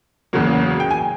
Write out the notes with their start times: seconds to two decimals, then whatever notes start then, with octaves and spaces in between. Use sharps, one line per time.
0.33 E2 C#3 F#3 A#3
0.80 G5
0.91 G#5